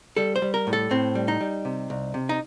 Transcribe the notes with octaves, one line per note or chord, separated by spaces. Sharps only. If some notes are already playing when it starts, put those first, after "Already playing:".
G3 A4
C5
G3
A#4
A2
A4
A2 C4
G3
D#4
G3
C3
C2
C3
D#4